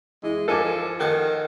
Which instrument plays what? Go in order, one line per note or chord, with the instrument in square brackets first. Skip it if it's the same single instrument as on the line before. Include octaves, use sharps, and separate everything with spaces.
[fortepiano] E3 [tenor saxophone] G#3
[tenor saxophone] F3 [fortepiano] A4 G#5 D6
[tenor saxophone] D#3 [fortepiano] A4 F#5 G5